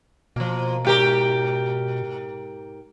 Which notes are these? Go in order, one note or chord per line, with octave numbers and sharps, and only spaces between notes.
B2 F3 A#3
G#2 G4 A#4